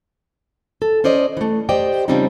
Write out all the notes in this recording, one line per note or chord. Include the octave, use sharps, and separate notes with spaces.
A4
C#4 C5 D5 D#5
E3 A3
G4 C5 D5 D#5 G5
C#3 F3 G3 C4 C#4 D#4